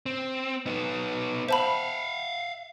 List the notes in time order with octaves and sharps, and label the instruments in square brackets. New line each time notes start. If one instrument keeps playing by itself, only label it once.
[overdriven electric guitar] C4
B3 D#4
[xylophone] C5 A5 B5 [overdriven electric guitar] E5 F5